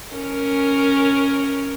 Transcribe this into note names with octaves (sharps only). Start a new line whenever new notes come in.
C#4 A#4